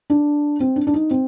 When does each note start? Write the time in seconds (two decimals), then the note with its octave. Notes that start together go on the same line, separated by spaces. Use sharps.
0.10 D4
0.60 C4
0.76 D4
0.87 D4
0.94 D#4
1.11 C4